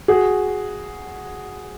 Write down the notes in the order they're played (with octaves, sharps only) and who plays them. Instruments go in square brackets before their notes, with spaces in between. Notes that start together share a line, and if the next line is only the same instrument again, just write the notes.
[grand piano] F#4 G#4